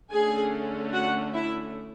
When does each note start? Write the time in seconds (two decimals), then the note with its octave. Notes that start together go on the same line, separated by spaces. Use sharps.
0.12 D3 A3 C#4 G#4 G#5
0.93 F#4 F#5
1.33 E4 E5